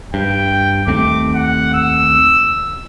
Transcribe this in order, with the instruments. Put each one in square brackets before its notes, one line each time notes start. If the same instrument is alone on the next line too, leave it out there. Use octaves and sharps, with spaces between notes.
[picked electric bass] G2 [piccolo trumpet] G5
[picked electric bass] D#2 A3 C4 [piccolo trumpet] D6
[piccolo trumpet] F#5
E6